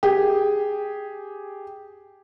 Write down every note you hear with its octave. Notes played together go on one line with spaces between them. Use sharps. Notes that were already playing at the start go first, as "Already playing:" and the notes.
G4 G#4